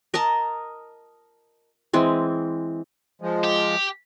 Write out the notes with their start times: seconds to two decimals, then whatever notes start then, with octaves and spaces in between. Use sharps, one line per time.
0.14 A#4 D#5 A5 A#5
1.93 E3 G#3 C4
3.22 F3 G#3
3.43 G4